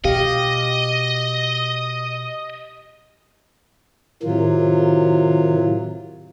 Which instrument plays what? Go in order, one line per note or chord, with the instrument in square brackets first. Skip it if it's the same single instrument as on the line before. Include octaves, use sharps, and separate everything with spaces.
[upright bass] B2 [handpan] G4 F5 [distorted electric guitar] D#5
[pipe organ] A2 D#3 [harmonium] C3 F#3 F4